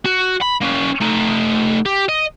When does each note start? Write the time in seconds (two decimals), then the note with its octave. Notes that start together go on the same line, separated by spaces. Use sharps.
0.05 F#4
0.41 B5
0.61 A#3 C#4
1.00 A3 D#4
1.86 G4
2.09 D#5